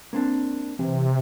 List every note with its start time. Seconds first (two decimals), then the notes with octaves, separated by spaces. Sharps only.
0.13 A#3 C4 D4
0.79 C3 E3